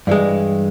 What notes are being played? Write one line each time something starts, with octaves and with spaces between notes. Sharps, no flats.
G2 E3 G#3